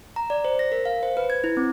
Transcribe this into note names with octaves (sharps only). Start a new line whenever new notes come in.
A#5
D5
C5
A#6
A#4
F5
C5
B4
G#6
E4
C4